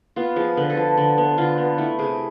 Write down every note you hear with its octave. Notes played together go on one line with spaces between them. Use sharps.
B3 F4
F3 G#4
D3 B4
A4
F3
D3
B3
D3 F4
B3
A3 E4
C3 G#4